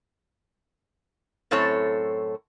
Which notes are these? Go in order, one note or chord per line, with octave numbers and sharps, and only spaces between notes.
F#2 A2 C4 A4 C#5